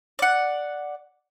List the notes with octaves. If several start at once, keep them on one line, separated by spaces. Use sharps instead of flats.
D5 F#5